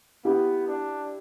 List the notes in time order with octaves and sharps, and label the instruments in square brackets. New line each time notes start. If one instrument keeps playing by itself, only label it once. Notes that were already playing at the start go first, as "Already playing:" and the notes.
[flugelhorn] B3 [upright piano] E4 G4
[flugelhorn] D4